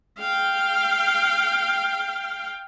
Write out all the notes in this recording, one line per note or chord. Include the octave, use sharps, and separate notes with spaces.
F5 G5